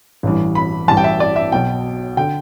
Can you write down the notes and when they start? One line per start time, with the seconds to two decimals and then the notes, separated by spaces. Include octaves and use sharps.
0.23 A1 G2 E3
0.55 B5
0.88 A1 G2 E3 A5
0.97 G5
1.04 E5
1.20 D5
1.36 E5
1.52 B1 B2 G5
2.17 D3 G5